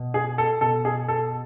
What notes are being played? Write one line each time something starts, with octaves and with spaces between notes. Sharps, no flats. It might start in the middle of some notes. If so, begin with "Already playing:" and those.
Already playing: B2
G#4
A4
B2 A4
G#4
A4